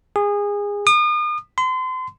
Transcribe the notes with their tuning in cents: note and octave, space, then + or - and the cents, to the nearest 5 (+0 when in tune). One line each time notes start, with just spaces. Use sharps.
G#4 -25
D#6 -40
C6 -35